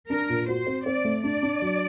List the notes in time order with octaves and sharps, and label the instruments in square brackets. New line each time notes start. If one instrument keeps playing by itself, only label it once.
[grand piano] D4 [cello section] A#4
[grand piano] A#2
[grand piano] F#4 [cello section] C5
[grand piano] C4
[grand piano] C4 [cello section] D5
[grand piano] A3
[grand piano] D4 [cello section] D5
[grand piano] D4
F#3